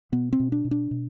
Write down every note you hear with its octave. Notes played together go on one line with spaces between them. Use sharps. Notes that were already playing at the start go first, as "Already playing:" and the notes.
B2 B3
C4
B2
D4
B2
D4
B2